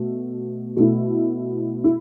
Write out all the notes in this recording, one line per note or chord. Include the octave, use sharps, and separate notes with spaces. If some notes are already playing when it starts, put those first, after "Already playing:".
Already playing: B2 A3
B2 A3 E4
E4